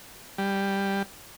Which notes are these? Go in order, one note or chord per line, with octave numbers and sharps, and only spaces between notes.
G3